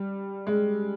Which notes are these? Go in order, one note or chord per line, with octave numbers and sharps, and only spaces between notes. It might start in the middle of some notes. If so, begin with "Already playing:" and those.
Already playing: G3
G#3